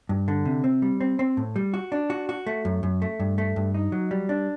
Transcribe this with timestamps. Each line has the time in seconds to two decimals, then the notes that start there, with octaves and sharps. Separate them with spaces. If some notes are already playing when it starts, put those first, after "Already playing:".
0.09 G2
0.28 D3
0.45 C3
0.64 C4
0.82 G3
1.01 C4
1.19 C4
1.37 A2
1.56 G3
1.74 F#4
1.92 D4
2.10 F#4
2.29 F#4
2.47 A3
2.65 F#2
2.83 F#2
3.02 A3
3.20 G2
3.38 A3
3.56 G2
3.74 D#4
3.92 F#3
4.11 G3
4.29 D4